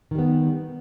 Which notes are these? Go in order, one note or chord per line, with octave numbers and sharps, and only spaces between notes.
D#3 G3 B3